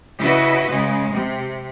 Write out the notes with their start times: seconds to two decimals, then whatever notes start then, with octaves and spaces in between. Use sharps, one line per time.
0.20 C#3 E4 F#4 B4 D#5
0.69 C#3 G#3
1.13 C3